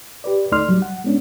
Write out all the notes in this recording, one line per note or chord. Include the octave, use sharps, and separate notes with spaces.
G4 B4 D5
D2 A3 D#4 D5 C6 F6
F#3 G3
F#5
G#3 B3 C#4 D4